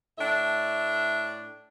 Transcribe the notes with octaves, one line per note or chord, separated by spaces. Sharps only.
A2 D4 E5